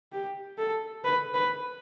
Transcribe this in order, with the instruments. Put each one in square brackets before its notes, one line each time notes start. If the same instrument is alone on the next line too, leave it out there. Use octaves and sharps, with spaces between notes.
[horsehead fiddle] G4
A4
B4
B4